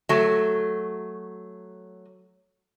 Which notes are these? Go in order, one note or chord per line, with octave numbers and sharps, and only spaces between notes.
F#3 A3